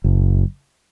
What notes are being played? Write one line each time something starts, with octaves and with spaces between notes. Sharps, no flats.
F#1